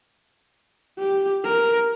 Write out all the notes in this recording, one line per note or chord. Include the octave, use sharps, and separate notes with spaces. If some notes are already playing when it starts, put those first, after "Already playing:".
G4
A#4